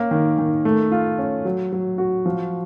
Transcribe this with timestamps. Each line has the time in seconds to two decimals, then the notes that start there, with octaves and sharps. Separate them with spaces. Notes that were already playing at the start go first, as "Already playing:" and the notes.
Already playing: A#3 C#4
0.11 D#3
0.38 D#3
0.65 A3
0.91 F4
1.18 C#4
1.45 F#3
1.72 F#3
1.98 F#4
2.26 F3